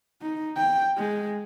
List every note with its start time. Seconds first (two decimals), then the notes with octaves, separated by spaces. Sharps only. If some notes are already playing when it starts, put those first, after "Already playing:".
0.22 D#4
0.57 G5
0.97 G#3